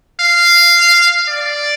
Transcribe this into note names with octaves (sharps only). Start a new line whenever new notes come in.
F5
D5